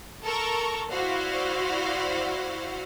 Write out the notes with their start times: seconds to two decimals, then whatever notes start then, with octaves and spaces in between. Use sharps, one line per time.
0.24 A4 A#4 A#5 C#6
0.90 E4 F#4 C5 D5 F5 F#5